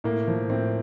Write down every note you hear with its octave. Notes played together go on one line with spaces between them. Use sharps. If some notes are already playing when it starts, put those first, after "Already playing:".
A2 A#3
F3
A2 C4